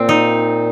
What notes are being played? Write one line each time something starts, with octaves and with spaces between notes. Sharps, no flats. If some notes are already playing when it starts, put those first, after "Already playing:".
Already playing: A#2 C4
D#4